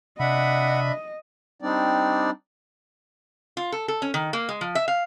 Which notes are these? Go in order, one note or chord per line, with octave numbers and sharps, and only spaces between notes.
C3 D4 D#5 E5 F#5 B5
G3 C4 D4 D#4 D5
F4
A4
A4
C#4
D#3
A#3
G#3
F3
E5
F5